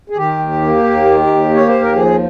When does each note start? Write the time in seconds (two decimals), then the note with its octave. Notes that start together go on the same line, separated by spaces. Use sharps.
0.10 G#4
0.17 D#3 G4
0.39 D#2
0.61 A#3
0.83 D#2
1.05 D#3
1.27 D#2
1.49 A#3
1.54 C#5
1.68 D#2 C5
1.80 A#4
1.93 F3 G#4